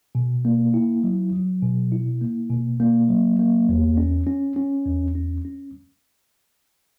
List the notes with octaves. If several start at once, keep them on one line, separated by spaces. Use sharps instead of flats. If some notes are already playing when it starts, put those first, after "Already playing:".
B2
A#3
E4
F#3
F#3
B2
E4
A#3
B2
A#3
F#3
A#3
E2
C#4
C#4
C#4
E2
C#4
C#4